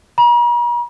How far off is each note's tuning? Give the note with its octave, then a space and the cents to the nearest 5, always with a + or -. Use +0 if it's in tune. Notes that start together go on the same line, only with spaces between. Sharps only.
A#5 +45